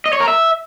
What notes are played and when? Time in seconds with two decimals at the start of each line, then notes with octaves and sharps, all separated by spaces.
0.06 D#5
0.13 C#5
0.20 A#4
0.28 E5